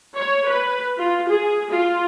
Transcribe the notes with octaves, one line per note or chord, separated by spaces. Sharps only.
C#5
B4
F4
G#4
F4